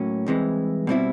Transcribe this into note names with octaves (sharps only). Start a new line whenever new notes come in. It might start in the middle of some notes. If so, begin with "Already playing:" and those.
Already playing: A2 F#3 A#3 C#4
C2 C3 E3 G#3
B2 G3 C4 E4